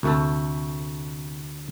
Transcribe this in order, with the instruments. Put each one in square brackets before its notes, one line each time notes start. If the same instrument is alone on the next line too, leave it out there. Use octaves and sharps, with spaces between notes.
[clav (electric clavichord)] D2 A3 A4 [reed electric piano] C3